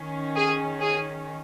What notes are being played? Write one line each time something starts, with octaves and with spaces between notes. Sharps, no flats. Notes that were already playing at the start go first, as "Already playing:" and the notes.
Already playing: D#3 C#4
G#4
G#4